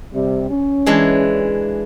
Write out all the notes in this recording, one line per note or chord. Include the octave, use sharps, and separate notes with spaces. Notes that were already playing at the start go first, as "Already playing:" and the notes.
C3 G3
C#4
E3 G#3 D4